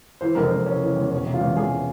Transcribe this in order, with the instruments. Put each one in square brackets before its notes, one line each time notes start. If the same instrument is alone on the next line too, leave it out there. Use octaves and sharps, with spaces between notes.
[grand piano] E3 C5
F1 A#4
C5
F1
C#3 C#4
E3
E2
E1 C#4
C3
F4
E2
E2 G#4